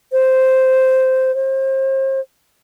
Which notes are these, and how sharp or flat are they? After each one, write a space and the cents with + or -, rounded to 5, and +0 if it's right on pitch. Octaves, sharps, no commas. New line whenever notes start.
C5 -5
C5 +35